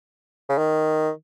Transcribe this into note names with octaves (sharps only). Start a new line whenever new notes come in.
C#3
D#3